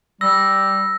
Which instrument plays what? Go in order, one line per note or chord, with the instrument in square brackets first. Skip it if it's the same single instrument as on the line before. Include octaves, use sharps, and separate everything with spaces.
[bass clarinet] G3 [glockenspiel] E6 [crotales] A#6